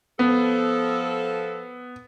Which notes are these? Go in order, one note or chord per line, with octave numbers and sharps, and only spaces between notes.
F3 B3 A4